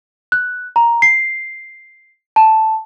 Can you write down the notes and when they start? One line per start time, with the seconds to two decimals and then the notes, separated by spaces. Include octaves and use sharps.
0.32 F#6
0.76 A#5
1.02 C7
2.36 A5